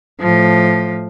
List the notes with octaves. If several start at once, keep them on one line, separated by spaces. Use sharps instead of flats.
A2 F3